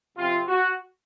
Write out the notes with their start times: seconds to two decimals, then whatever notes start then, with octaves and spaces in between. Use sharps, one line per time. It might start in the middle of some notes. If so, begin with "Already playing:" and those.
0.16 C3 F3 C4 F4
0.47 F#4